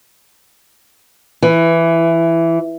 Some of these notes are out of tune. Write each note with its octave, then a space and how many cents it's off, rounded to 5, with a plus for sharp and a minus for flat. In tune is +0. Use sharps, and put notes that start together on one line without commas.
E3 +10